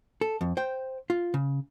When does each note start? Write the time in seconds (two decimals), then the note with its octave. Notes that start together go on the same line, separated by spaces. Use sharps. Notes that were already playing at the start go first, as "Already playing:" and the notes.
0.21 A4
0.41 F2
0.57 C5 G5
1.10 F4
1.34 C#3